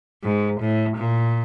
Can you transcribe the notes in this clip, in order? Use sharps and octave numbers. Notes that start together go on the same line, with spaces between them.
G#2
A2
A#2